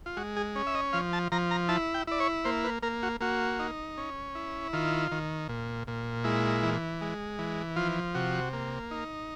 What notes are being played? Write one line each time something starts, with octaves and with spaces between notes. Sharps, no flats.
F4
G#3 F#4
G#4
C#4
E5
D#5
F3 F5
A5
F3 A#5
A#5
E4 A5
G5
E4 D5
C#5
A#3 C5
B4
A#3 A#4
F#4
A#3 F#4
D#4
C#4
E4
D#3 F4
D#3
A#2
A#2
G#3 E4
E3
G#3
E3
F3 F4
C3 F#4
A#3
D#4